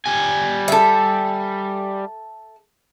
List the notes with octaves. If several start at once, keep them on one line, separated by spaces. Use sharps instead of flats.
G3 G#5
A4 E5